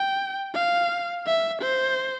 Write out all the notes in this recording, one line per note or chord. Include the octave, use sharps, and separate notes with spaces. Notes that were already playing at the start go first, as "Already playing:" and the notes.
Already playing: G5
F5
E5
C5